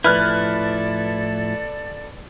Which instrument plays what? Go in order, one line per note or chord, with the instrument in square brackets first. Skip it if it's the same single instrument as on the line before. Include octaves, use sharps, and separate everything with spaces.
[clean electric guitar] A2 F3 E4 [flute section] A4 D5 [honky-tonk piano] B4 F6 F#6